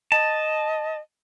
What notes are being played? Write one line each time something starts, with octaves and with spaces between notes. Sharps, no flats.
D#5 A5